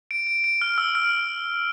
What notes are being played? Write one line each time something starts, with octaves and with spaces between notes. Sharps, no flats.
D7
D7
D7
F6
E6
F6